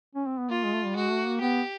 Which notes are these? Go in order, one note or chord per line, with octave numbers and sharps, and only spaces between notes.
C#4
C4
B3
A#3 F4
G#3
A3
G3
G#3 F#4
A3
A#3
B3 G4